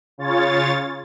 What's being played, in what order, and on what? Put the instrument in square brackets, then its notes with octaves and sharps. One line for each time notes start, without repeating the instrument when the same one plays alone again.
[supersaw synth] C#3 F4 C#5 A6